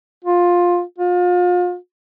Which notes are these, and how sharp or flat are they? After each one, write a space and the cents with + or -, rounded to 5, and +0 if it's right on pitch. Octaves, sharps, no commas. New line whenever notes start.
F4 +10
F4 +35